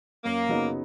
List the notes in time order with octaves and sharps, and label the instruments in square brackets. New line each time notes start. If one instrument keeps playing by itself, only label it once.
[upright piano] F#2 [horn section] A#3
[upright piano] C#3 F#3 B3 D#4